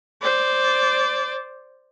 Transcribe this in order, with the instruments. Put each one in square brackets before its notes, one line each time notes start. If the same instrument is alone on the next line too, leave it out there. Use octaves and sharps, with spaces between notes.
[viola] C5 D5